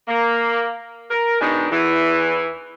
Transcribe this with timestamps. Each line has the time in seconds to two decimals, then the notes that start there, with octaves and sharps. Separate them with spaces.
0.08 A#3
1.10 A#4
1.41 B2 D#3 G#3 D4 D#4
1.71 E2 E3